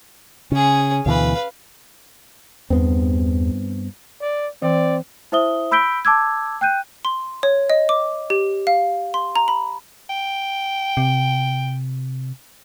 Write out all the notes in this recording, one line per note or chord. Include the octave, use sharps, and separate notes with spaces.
C#3 C#4 G#4
D2 B2 E3 B4 F5
E2 G2 B3 C4
D5
E3 C4 D5
E4 C5 E5 D#6 G7
B5 E6 G6 B6 D7 G7
A5 D6 E6 G#6
G5 F#6 G6 D#7
C6
C#5
D#5
D6
G4
F5
C6
A#5
B5
G5
C3